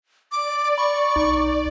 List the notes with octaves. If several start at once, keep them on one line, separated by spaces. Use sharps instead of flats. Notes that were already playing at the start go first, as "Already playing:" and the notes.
D5 D6
B5 C#6
B1 D#4